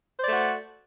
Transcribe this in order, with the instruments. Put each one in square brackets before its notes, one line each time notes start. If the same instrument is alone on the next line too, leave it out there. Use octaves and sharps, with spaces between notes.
[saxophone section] C5
D5
A3
F#4